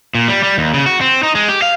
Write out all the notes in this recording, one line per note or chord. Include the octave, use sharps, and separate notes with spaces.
A#2
G3
G3
D#2
C#3
F#4
C4
D#4
G#3
G4
F5